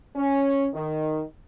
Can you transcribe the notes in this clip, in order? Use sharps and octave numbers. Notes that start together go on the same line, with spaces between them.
C#4
D#3